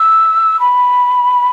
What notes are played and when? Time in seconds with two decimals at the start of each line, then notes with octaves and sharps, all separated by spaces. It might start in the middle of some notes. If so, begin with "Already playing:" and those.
Already playing: E6
0.60 B5